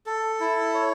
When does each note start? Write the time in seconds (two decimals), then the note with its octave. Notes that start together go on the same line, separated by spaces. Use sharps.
0.06 A4
0.40 E4
0.74 C#5